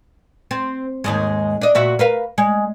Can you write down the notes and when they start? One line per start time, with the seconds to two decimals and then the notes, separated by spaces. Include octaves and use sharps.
0.51 C4
1.04 D#2 G#2 G#3
1.61 D4 D#5
1.75 A#2 F#4 E5
1.99 A#4 B4 F5
2.38 G#3